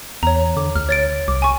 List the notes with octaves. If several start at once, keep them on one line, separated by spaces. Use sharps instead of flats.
E2 C#5 A#5
D3 D6
D2 F6
C#5 A6 D7
C2 D6
G#5 C#6